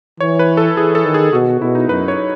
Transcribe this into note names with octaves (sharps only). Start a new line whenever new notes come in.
E3 C#5
B4
A4
E3 G#4
A4
D#3
G#4
B2 F#4
B2 E4
D#4
F#2 B4
C#5